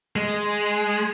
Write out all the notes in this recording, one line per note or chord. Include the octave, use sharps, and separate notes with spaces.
G#3